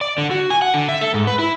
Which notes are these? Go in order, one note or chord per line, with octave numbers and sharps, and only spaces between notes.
D5
D3
F#4
G#5
F#5
D3
E5
A4
G#2
B4
E4